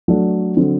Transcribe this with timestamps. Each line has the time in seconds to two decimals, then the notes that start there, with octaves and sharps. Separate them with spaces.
0.08 F#3 A3 D4
0.57 D3 F#3 C4